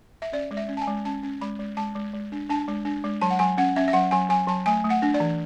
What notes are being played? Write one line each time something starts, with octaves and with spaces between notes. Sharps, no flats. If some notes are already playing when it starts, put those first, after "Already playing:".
E5
C#4 D5
G#3
E5
C#4
A5
G#5
G#3
C#4 A5
C#4
G#3 B5
G#3
G#3 A5
G#3
G#3
D4
D4 A5
G#3
D4
G#3
F#3 A5
F#5
F#3 G#5
C#4 F#5
C#4 E5
E5
F#3 F#5
F#3 G#5
F#3 G#5
F#3 A5
A3 G#5
A3
F#5
D4
D5
E3